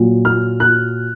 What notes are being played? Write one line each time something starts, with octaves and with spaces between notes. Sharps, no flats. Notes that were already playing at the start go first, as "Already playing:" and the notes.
Already playing: A#2 F#3
F6
F#6